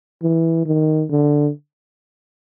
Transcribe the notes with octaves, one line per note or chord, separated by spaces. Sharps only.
E3
D#3
D3